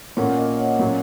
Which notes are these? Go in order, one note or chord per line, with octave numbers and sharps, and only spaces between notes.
A#2 A#3 C#4 C#5 F#5
A#4 D#5
C#5 F#5
A#2 F#3 C#4